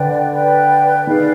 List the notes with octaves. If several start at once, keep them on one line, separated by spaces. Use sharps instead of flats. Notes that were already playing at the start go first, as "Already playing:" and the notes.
Already playing: D3 B4 D5 G5
B4 D5 G5
D#3 G#4 B4 D5 F5